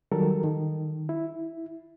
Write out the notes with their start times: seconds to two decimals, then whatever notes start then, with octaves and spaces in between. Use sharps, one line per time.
0.12 D#3 F#3 G3 A4 A#4
0.44 D#3
1.09 E4